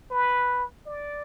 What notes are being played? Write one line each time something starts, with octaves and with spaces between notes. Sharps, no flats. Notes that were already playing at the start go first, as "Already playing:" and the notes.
B4
D5